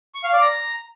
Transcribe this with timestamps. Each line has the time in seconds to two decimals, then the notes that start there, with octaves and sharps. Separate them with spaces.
0.15 C#6
0.24 F5
0.33 D5
0.42 A#5